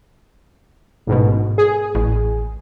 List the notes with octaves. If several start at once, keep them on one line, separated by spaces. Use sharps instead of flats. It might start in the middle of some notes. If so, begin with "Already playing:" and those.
A1 G#2 B2
G#4
A1